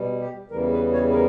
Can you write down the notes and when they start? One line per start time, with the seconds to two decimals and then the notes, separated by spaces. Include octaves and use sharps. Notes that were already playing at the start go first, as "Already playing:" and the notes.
Already playing: B2 G3
0.20 G4
0.51 E2 C#3 E3 G3 A#4
0.72 B4
0.92 C#5
1.09 B4
1.13 A#4